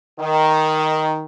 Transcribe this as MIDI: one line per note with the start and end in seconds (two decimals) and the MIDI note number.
0.19 1.23 51